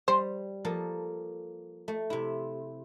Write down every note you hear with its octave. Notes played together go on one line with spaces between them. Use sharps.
G3 C5
F3 A#3 A4
A3
C3 E4